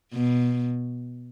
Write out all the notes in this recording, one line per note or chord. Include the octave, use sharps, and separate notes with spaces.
B2